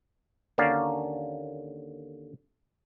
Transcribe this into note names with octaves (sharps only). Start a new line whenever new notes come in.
D#2 D3 A#3 C#4 D5 F5